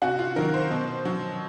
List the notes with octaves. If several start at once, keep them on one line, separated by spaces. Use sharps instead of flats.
C3 F#4
F4
D#3 F#3 A#4
C5
B2
F#3